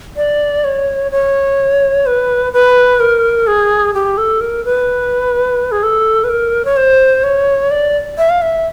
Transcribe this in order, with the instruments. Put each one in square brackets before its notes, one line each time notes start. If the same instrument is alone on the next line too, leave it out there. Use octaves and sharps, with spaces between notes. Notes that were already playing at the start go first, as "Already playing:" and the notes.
[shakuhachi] D5
C#5
C#5
B4
B4
A#4
G#4
G4
A4
A#4
B4
G#4
A4
B4
A#4
C#5
C5
C#5
D5
E5
F5
E5